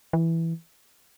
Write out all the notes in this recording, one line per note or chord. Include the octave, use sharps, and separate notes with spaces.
E3